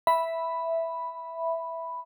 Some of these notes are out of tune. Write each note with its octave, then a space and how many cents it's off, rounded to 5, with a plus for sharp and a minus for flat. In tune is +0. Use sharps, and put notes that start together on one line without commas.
E5 +0 B5 +0